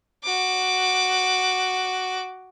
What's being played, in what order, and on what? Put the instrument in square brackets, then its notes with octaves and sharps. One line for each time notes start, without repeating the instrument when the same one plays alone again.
[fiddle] F#4 D6